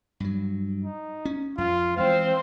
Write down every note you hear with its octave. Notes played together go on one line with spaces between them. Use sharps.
G2 F#3
D#4
C#4
F2 F4
E3 G#3 C4 C5 F5